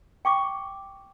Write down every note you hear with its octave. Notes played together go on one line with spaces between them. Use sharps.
G5 C#6 D6